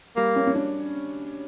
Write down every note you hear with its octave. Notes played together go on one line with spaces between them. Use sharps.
G3 A#3
C#4
C#4
D4